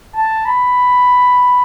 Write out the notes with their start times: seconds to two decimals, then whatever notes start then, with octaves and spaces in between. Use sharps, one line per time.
0.15 A5
0.45 B5